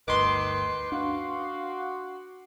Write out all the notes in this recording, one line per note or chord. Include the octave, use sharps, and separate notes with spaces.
G1 D2 D#3 B4 C6 D6
D4 F#4 F5